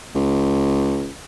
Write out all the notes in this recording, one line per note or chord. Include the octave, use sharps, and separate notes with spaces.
C#2